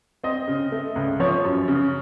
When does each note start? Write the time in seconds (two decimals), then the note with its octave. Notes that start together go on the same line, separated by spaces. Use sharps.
0.24 C4 D#5
0.48 C#3
0.72 A3
0.96 C#2
1.20 F3 C#5
1.44 F#2
1.68 C#3